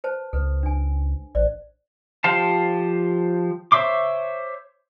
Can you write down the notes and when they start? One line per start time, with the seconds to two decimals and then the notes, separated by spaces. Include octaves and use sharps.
0.04 B4 C5 A5
0.33 C#2 A4 B4
0.63 D4 G#5
1.35 A1 C5 D5
2.24 F3 G4 C5 F5 A5
3.72 C5 C#5 E5 C6 D6